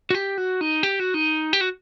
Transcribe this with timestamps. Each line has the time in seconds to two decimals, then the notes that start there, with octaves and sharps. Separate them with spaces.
0.10 F#4
0.15 G4
0.38 F#4
0.61 D#4
0.83 G4
1.00 F#4
1.14 D#4
1.53 G4
1.61 F#4